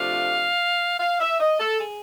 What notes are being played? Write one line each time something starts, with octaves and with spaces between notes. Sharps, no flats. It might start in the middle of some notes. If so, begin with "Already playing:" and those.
Already playing: C3 F3 A3 D4 F4 F5
F5
E5
D#5
A4
G#4